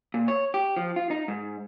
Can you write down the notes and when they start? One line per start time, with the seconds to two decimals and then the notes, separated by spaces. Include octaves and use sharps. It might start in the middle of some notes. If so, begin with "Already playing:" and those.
0.14 A#2
0.28 C#5
0.54 G4
0.76 F3
0.96 F4
1.11 D#4
1.28 G#2